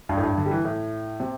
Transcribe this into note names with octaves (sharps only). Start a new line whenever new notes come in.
G2
A2
G2
D3
G3
E3
A2
C3